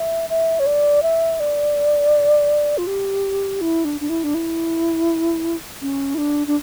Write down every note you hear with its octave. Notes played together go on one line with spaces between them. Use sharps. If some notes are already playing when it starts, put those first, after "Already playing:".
Already playing: E5
E5
C#5
D5
E5
D5
F4
G4
E4
D4
D4
E4
D4
E4
C#4
E4
D4
D4